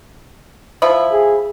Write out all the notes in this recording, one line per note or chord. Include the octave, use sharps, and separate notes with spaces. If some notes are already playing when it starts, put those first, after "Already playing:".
F3 E4
G#4